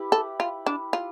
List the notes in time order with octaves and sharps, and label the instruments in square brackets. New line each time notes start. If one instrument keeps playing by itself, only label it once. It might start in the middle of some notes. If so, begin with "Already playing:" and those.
Already playing: [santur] E4 G4 B4
[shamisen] A4
F4
D4
F4